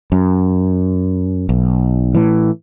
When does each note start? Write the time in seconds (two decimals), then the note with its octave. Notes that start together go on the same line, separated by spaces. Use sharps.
0.12 F#2
1.49 B1
2.14 A2 E3